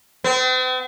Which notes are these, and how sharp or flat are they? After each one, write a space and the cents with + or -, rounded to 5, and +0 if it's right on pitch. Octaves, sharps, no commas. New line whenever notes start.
C4 -45